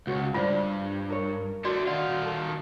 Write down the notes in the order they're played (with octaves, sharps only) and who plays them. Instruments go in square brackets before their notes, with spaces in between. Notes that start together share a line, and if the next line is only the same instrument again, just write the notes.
[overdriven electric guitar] C#2 [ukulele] F#4 C#5
[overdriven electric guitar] G2 [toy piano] F4 C5 [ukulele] D5
[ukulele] A#4 C#5
[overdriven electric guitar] A3 D4 [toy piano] F#4 D5
[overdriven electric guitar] D#3 F4 [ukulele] F#4 [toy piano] D5
[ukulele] A4